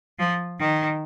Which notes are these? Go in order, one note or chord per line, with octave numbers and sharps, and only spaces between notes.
F3
D#3